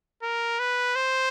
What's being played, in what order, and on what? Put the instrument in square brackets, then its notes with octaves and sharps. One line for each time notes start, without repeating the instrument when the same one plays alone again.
[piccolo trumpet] A#4
B4
C5